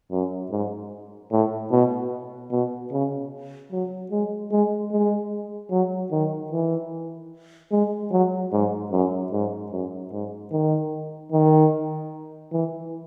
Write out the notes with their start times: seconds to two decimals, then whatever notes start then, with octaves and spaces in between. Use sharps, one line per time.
0.11 F#2
0.51 G#2
1.32 A2
1.71 B2
2.51 B2
2.92 C#3
3.71 F#3
4.11 G#3
4.52 G#3
4.91 G#3
5.71 F#3
6.12 D#3
6.52 E3
7.72 G#3
8.12 F#3
8.52 G#2
8.92 F#2
9.32 G#2
9.72 F#2
10.12 G#2
10.52 D#3
11.32 D#3
12.52 E3